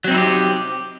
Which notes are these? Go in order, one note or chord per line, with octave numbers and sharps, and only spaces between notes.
F#3 C4 D#4 E4 G4